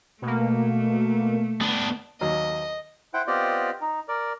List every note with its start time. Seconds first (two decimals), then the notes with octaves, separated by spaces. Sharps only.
0.22 B2 A3 A#3
1.61 B3 D4
2.21 D#2 F#3 D#5
3.14 E4 C5 F#5 G5
3.27 B3 C4 F4 G4 D5 D#5
3.82 D#4
4.08 A#4 D5